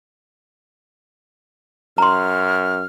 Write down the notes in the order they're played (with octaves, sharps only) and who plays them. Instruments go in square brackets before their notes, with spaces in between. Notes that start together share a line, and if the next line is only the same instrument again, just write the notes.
[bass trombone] F#2 [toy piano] A#5 C6 [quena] F6